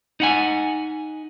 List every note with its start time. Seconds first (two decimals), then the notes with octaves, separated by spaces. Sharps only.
0.20 D#4 F#5 G#5